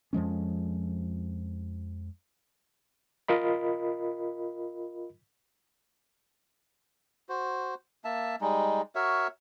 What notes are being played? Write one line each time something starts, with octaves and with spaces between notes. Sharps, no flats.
F2 F3 G#3 C#4
F4 A#4 D#5 B5
F#4 C5
A#3 E5 A5
G3 G#3 D#4
F#4 A#4 C#5 E5